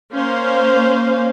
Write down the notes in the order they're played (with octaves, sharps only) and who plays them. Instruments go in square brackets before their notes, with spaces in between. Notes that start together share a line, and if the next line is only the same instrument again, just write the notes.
[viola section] A#3 C#4 C5 F5